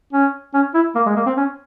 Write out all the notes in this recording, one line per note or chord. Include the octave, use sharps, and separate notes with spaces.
C#4
C#4
E4
A#3
G#3
A#3
C4
C#4